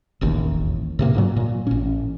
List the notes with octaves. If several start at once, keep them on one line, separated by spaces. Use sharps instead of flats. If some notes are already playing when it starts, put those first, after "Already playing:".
E1 A1 D#2
A2 C3 A#3
G2 A#2 F#3
A#2
A1 C#4